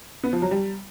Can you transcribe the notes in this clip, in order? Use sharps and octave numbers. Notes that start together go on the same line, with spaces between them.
B3
F3
F#3
G3